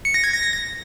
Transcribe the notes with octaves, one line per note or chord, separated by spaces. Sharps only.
C#7
A#6
G#6
A#6